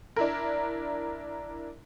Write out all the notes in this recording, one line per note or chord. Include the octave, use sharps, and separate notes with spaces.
D4 E4 A#4